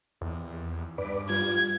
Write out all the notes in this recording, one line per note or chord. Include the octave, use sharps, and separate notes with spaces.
E2
G2 B4 D5
G3 F4 G#6